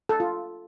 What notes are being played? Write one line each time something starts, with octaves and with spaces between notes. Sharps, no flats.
A4
F4